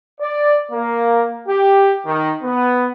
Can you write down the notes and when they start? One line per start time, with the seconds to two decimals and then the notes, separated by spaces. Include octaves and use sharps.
0.20 D5
0.72 A#3
1.47 G4
2.05 D#3
2.42 B3